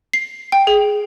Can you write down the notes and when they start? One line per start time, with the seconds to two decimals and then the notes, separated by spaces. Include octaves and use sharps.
0.13 C7
0.52 G5
0.67 G#4